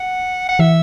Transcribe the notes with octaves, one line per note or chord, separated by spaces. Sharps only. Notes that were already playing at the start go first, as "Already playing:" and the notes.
Already playing: F#5
F#5
E3 E5